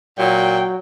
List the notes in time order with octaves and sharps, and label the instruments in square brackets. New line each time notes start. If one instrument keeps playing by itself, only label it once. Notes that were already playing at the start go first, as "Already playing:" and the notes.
[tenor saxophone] A#2 [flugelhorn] F#3 [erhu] G5